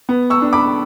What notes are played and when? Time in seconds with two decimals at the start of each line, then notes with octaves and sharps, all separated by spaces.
0.09 B3
0.30 C#6 E6
0.42 D4
0.53 B5 D6